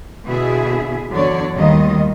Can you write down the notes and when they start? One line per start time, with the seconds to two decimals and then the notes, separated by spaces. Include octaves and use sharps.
0.25 B2 D3 B3 E4 G#4 E5
1.13 E2 D3 F#3 C#5 D5
1.54 D#2 A2 D#3 G3 F4 D#5